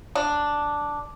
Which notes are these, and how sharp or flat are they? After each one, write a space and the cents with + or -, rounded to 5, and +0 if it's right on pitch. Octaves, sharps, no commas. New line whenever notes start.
D4 +0